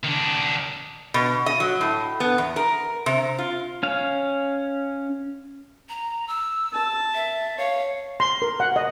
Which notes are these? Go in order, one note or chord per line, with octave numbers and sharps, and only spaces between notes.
D#3 D4
B2
D#5
F#3
A2
B3
E2
A#4
C3
F4
C#4 F5
A#5
E6
A5
E5
C#5 F5
C6
A#4
F#5
D#5